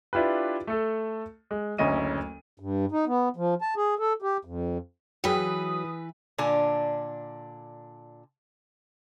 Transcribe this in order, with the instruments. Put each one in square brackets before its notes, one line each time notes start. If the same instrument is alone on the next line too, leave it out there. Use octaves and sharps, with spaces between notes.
[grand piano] D4 E4 F4 G4 B4
A3 A4
G#3
F#1 D2 C#4 D#5 D#7
[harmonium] G2
D#4
B3
F3
A5
G#4
A4
G4
F2
[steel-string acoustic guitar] E3 B4 [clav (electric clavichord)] F#3 [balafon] G#4 G5 [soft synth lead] D#6
[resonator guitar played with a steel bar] A#2 D3 D4 G#5